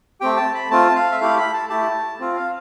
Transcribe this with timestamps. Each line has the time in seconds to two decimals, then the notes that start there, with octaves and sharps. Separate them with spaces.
0.21 A3 C4 G4 G5
0.37 A5
0.54 B5
0.70 A3 C4 F4 A5
0.96 F5
1.11 E5
1.20 A3 E4 G4 F5
1.38 B5
1.54 A5
1.70 A3 E4 G4 A5
2.20 C4 F4
2.36 F5